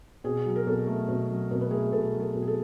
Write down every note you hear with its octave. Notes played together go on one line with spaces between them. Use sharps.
B2 G#4
F#3
A#4
B2 A4
A3
B2
F#3
B2 A#4
B4
A3 G#4 A#4
B2 A4 B4
F#3
G#4 A#4
B2
G#4
A4